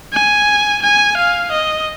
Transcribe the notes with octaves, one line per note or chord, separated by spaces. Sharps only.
G#5
G#5
F5
D#5